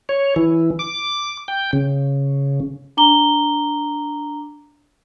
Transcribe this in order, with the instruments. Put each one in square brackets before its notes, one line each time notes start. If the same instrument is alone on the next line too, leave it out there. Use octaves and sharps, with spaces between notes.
[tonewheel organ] C#5
E3
D6
G5
C#3
[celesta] D4 A#5 D6 G7